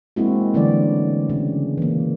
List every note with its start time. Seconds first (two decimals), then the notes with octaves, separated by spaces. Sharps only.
0.16 G#3 A#3 C4 E4 F#4
0.54 D3 E3 F#3 A3 C#4 D5
1.30 C#3
1.78 E3 A#3